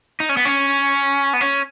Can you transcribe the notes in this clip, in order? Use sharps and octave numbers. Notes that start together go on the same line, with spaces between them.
D#4
C#4
B3
C#4
B3
C#4